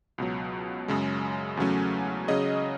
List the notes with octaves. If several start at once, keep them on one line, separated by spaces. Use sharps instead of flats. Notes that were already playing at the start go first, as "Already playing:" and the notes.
C#2 B2 F#3
F#2 C#3 G#3
E2 C#3 F#3 A3 C#4
C#3 F#3 C#4 G#4 D#5